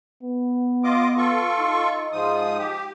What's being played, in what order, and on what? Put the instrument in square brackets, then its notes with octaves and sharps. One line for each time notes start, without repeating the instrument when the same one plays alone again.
[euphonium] B3
[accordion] F4 D#5 D6
F4 A4 C#6
[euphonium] D#4
[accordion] G#2 F3 D#6
G4